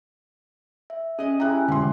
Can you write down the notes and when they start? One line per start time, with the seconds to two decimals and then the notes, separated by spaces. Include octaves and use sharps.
0.90 E5
1.19 C#4 G#4 D#5
1.40 G#3 E4 G4 A#5 F#6
1.68 E1 D3 C6